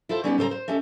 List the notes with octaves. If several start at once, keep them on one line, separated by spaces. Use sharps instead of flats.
E4 F4 A4 C5
G3 B3 C#4 D#4 F#4 G4
C#3 A4 C5 D5 A#5
C5
A3 C#4 G4 A4 D#5